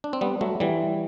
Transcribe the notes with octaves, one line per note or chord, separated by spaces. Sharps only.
D4
C4
G3 B3
F#3 A3
E3 G3